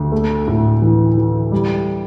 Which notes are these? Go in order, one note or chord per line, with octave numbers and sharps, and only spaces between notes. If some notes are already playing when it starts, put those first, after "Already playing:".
Already playing: D2
A3
A2
E3
E3
G3